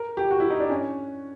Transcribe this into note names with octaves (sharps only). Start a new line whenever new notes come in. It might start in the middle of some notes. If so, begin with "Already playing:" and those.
Already playing: A#4
G4
F#4
E4
D#4
D4
C#4